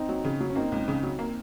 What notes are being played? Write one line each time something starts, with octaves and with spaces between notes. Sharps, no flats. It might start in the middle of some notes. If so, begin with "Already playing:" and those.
Already playing: C4 D#4
F#3
C#3
F#3
C#4
A#3 C4 D#4
C#2
C#3
F#3
A#3